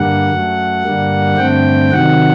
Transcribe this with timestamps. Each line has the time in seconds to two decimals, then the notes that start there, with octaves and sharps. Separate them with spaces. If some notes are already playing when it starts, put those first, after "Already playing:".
Already playing: G2 D3 G3 A#3 F#5
0.30 F#2 F#3 A3
0.83 G2 D3 G3 A#3
1.37 G2 D3 A3 C4 G5
1.91 C3 D#3 F#3 F#5